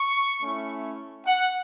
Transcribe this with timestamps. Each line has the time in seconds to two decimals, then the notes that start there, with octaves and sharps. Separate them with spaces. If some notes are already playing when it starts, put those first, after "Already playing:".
Already playing: C#6
0.41 A3 C#4 E4
1.26 F#5